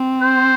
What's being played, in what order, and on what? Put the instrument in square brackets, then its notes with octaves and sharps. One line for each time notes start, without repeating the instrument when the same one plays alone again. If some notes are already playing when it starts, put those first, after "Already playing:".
Already playing: [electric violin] C4
[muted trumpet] C5